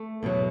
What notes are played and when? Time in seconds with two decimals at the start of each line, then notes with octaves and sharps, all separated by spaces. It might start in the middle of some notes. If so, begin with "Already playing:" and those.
Already playing: A3
0.23 E2 B2 F#3